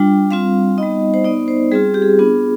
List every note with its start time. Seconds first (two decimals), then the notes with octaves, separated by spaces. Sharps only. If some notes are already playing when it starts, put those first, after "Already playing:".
Already playing: G3 D4 F4 G5
0.31 G3 C4 F4 F5
0.78 G3 B3 D#4 D#5
1.14 C5
1.24 B3 D#4 D5
1.48 C5
1.71 G3 C4 F4 G#4
1.94 G4
2.02 G#4
2.19 B3 D4 F4